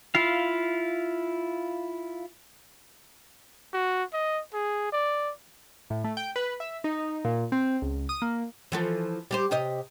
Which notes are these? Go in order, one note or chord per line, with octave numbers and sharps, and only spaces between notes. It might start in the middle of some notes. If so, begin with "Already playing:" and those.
E4 F4 F5
F#4
D#5
G#4
D5
A2
A3
G5
B4
E5
D#4
A#2
C4
C#2
D#6
A#3
E3 F3 A4
G3 G4 C5
C3 G4 D#5